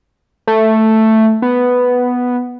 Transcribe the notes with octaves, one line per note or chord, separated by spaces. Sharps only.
A3
B3